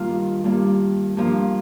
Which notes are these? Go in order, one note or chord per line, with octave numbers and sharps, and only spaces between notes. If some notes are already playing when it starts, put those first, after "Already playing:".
Already playing: G2 D#3 G3 A#3 F4
G2 G3 A#3
G2 F3 A#3